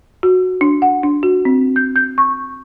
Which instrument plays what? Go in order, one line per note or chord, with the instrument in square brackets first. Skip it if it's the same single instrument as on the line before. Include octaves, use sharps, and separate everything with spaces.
[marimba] F#4
D4
F#5
D4
F#4
C4
G6
G6
C#6